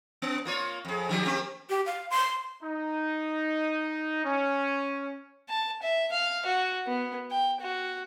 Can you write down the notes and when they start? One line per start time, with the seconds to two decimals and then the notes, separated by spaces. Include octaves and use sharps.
0.22 B3
0.45 A#3 F4 C#5
0.85 F2 G#4
1.09 D#3 F3 G4
1.25 A#3 C4 G4
1.70 G4
1.86 F5
2.10 C6
2.63 D#4
4.25 C#4
5.49 A5
5.82 E5
6.12 F5
6.46 F#4
6.87 B3
7.31 G5
7.61 F#4